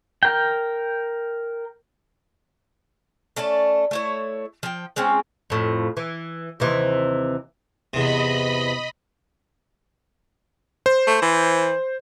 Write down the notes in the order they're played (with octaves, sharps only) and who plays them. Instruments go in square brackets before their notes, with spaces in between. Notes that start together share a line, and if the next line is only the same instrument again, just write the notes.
[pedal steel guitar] A#4 G5
[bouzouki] A3 C#4 D5 A5
A3 E4 C#5
F3 G5
G#3 C4 C#4 F4
[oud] F2 A2
E3
D#2 C3 E3
[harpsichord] E2 C3 [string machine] D#5 B5
[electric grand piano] C5
[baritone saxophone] A3
E3